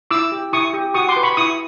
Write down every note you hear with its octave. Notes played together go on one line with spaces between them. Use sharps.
E4 D6 E6
G4
E4 C#6 D#6
G4
F#4 C#6 D#6
C6 D6
B4
B5 C#6
E4 C#6 D#6